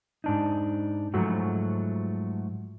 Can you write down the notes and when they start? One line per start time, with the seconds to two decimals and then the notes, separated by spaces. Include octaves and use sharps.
0.24 G#2 D4 D#4
1.14 G#2 F3 F#3 A3 F#4